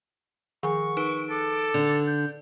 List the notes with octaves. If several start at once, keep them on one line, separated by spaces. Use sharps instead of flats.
D#3 F3 C#6
D#4 B4 D7
A4 D6
D3 D5
G6